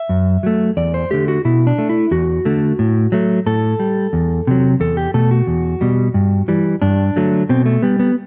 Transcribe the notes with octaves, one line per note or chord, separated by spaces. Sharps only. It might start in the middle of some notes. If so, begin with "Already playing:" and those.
Already playing: E5
F#2
F#3 A3
E2 D5
C5
D3 A3 G4
F#4
B2 E4
D4
A3
E4
E2 F#4
D3 A3
A2
F#3 A3
A2 A4
G3
E2
C3 F#3
E2 A4
G4
B2 A3 A4
F#4
E2
B2 G3
G2
E3 G3
G2 D4
D3 F#3 A3
B2 C4
A3
G3 B3
B3